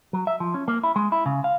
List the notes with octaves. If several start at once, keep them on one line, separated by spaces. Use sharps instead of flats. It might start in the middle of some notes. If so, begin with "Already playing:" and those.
F#3
E5
F3
C#4
A#3
E4
G#3
E4
C#3
F5